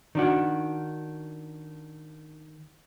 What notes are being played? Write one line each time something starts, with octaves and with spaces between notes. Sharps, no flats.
D#3 D4 F#4